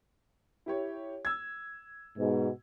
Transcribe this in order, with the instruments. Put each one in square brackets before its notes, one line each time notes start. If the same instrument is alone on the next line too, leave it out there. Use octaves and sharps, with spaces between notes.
[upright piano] E4 G4 C#5
E6 G#6
[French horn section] G#2 B2